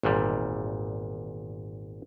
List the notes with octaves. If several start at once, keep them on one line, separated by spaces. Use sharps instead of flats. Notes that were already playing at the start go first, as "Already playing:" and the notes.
G#1 E2 A#2 G3